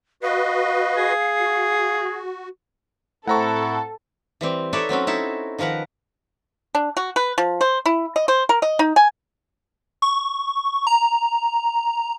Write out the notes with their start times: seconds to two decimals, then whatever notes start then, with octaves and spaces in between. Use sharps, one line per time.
0.23 F#4 B4 D#5 F5
0.97 G#4
1.41 F#4
3.27 A2 C4 E4 A4 F#5 A5 A#5 C#6
4.41 E3 G3 C4
4.73 D#4 A4 B4 C#5 D5 E5
4.89 F#3 C4 C#4 F#4
5.07 D#4 E4 A4
5.58 D#3 F3 A#4 B4 F#5
6.75 D4
6.97 F#4
7.16 B4
7.38 F3
7.61 C5
7.86 E4
8.16 D#5
8.28 C5
8.49 A#4
8.62 D#5
8.79 D#4
8.96 G#5
10.02 C#6
10.87 A#5